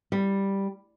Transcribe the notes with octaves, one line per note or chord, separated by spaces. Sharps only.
G3